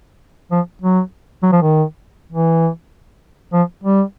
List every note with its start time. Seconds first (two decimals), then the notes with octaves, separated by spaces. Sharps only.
0.51 F3
0.82 F#3
1.43 F#3
1.52 F3
1.62 D#3
2.32 E3
3.53 F3
3.84 G3